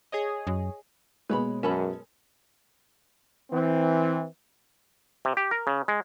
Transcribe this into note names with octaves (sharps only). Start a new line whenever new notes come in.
G#4 C#5 D#5
F#2
B2 G#3 A#3 B4 C#5 B5
F#2 C#4 A4 A#4 B5
E3 C4
C3
G4
A#4
C#3
G#3